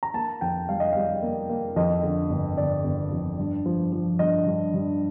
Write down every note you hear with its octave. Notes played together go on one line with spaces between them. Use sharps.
A#5
A#3 A5
F2 G5
G3 F5
D#5
G3 F5
A#3
A#3
F2 D#5
D3
G1
G1 D5
G1
F2
G2
F3
F3
G2 D#5
G2
G2